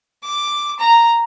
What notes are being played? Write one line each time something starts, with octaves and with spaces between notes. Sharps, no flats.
D6
A#5